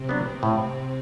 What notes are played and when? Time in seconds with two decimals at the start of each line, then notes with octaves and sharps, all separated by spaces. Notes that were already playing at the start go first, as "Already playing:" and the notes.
Already playing: C3 C4
0.09 F#3 B3 D4
0.43 A2